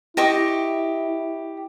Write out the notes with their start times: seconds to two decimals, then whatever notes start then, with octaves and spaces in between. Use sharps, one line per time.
0.17 E4 G4 D#5 C#6